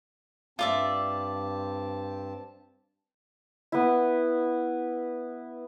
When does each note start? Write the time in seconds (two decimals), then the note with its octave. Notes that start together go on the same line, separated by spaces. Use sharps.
0.59 G2 C4 F4 D5 E5 A5
3.72 B3 E4